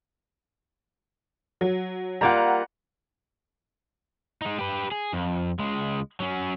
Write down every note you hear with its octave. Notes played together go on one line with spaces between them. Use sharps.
F#3
G3 A#3 F4 F#5 A#5
G#3 D#4
G4 B4
G#4
F2
C#2 G#3
F#3 C#4